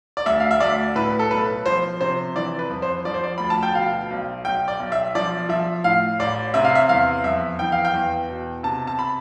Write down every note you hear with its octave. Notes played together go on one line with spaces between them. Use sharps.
D5
D2 E5
F5
E5
D2 D5
A2 B4
A4
B1 B4
F3 C5
C3 C5
E3 D5
B4
F2
C5
F3 D5
C5
D5
D2 B5
A5
G5
B2 F5
B1
B1 G5
D5
B1
E5
F3 D5
F3 E5
A2 F5
A1 D5
C3 E5
F5
E5
E2 F5
F2 E5
E3 G5
F5
G5
E2
B2
C3 A5
A5
B5